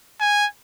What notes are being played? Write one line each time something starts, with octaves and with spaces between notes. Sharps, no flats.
G#5